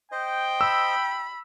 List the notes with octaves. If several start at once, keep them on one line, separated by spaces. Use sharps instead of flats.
C5 D#5 G5
B5 E6